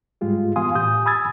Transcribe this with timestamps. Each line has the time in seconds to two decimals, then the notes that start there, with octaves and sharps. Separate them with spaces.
0.21 G#2 G3 G#3 F4 G4
0.56 E3 B3 F5 G#5 C6 D#6
0.75 A2 G4 G#5 D#6 G6
1.06 G#5 B5 D#6 E6 G#6 A6